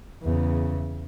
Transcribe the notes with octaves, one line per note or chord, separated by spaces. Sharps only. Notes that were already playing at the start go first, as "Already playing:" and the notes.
E2 C#3